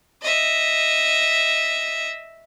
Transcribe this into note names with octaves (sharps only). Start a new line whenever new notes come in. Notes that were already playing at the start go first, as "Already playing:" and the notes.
D#5 E5